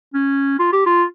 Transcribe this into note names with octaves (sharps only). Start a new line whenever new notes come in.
C#4
F4
G4
F4